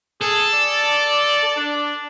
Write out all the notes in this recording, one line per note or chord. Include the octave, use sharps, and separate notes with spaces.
G#4 A4
D5
D4